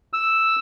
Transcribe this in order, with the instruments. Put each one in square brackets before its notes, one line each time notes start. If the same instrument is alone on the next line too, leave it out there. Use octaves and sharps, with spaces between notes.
[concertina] E6